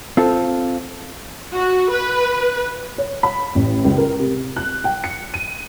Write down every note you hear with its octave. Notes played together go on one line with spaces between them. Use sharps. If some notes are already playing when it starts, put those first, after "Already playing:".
C4 F4 A4
F#4
B4
C#5
B5
A1
C#2
A#4
C3
F#6
G5
C#7
D#7